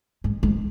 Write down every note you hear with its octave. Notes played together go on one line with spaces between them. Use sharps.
G#2
G#2